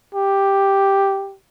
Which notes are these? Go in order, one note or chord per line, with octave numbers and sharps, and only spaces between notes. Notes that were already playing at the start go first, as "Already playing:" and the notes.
G4